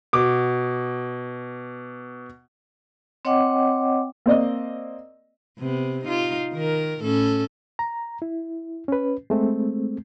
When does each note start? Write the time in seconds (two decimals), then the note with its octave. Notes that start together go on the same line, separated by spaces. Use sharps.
0.13 B2 D6
3.25 C4 C#5 D#5 F#5 G5 D6
4.26 A#3 C4 D5 D#5
5.59 C3 B3
6.05 D#4 F4
6.53 D#3 A#4
7.02 A2 C#4 A4
7.79 A#5
8.22 E4
8.88 C#4 B4
9.30 G#3 A3 C4